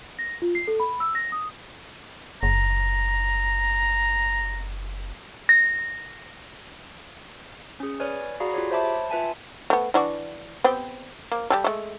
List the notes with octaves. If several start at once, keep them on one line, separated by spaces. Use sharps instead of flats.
A#6
F4
C7
A4
B5
E6
A#6
D#6
F#1 A#5
A#6
C#4 G#4
B4 C#5 D5 G#5 F6
F#4 G#4 D5 F5 A#5 B5
F4 G4 G#4 C#5
C5 C#5 E5 A5 B5 D6
F4 B4 E5 G#5 A5
A3 B3
E3 D4 F#4
B3 C4 G4
A#3
G3 G4 A4
G#3 A3